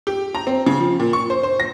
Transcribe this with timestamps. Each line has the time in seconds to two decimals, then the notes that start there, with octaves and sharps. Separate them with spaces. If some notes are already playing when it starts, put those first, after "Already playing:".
0.07 G4
0.35 A#5
0.47 C4
0.66 C#3
0.80 F3
1.00 A#2
1.13 C#6
1.30 C5
1.43 C5
1.60 A#6